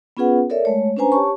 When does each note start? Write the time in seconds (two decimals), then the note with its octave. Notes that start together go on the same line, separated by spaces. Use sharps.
0.17 B3 C#4 F4 G#4 B4 F#5
0.50 A4 A#4 C#5 D5 E5
0.65 G#3 A3 C#5
0.97 C#4 D4 B4 C5 G#5 A#5
1.12 G4 C#5 A5 C#6